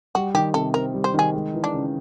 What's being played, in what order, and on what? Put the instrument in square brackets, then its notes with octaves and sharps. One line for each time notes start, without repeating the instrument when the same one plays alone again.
[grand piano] G3 [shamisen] F#4
[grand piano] D#3 [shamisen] G4
[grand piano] C3 [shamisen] A4
[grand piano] C4 [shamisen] A#4
[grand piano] G3
[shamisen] C5
[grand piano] D#3 [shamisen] G#4
[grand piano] G#3
E3
[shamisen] D4
[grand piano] C#3